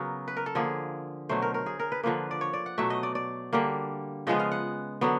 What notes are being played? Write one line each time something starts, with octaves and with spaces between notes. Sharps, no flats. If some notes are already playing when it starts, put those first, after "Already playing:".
Already playing: C#3 F#3 B3 A#4
B4
A#4
A4
D3 F3 A#3 G#4
B2 F#3 A3 C5
A#4
A#4
G#4
A#4
B4
D3 F3 A#3 B4
D5
C#5
D5
F#5
B2 F#3 A3 E5
D#5
D5
D5
D3 G3 A#3
C#3 F3 G#3 B3 D#5
F5
F#5
D3 F#3 B3